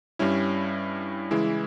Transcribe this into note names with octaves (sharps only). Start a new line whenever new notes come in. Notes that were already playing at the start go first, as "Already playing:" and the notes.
G2 G3 C#4 E4
C#3 E3 G#3 E4